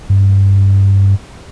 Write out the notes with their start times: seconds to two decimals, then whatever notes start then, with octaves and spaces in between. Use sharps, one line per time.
0.10 G2